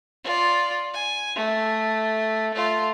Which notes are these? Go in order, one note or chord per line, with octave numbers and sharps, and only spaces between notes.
F4 D5
G#5
A3
A3 F4